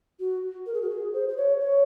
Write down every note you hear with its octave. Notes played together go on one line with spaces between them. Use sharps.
F#4
A#4
G#4
F#4
G#4
C5
C5
C#5
C#5